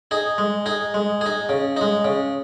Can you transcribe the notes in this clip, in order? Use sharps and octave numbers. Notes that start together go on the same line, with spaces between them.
D#4 G#4
G#3
D#4 G#4
G#3
D#4 G#4
C#3
G#3 D#4
C#3